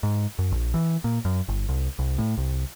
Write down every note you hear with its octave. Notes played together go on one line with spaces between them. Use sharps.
G#2
F#2
A#1
E3
A#2
F#2
G1
C2
C2
A2
C2